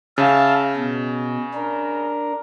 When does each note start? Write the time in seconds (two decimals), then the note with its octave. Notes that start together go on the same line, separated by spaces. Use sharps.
0.18 C#3 E5 F5 A5
0.76 B2
1.54 D4 A#4